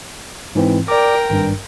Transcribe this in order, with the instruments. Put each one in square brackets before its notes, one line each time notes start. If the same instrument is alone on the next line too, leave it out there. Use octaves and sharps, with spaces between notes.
[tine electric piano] G#2 E3 C4
[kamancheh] A#4 G5 [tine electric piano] D5 D6
[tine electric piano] G#1 G2